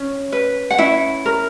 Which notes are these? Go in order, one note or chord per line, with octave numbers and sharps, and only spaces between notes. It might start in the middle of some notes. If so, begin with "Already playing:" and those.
Already playing: C#4 C#5
B4
F#5
C#4 E4 E5
A#4